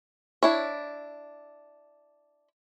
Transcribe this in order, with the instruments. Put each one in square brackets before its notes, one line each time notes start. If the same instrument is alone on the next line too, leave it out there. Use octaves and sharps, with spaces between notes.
[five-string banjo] D4 E4 C#5